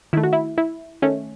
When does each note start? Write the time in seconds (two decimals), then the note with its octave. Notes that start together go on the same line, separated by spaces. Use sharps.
0.13 D#3 A3 E4
0.23 F#4
0.33 E4
0.58 E4
1.02 D#3 A3 C#4